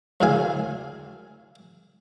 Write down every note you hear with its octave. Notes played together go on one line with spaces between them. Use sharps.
C#2 F#2 A2 D3 F5 G#5